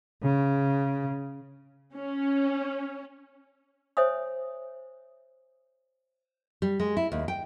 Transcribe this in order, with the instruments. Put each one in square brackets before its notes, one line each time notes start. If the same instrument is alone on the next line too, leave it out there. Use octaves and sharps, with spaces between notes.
[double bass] C#3
[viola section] C#4
[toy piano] C5 C#5 E5 G#5 D#6
[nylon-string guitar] G3
G#3
E4
D#2
G5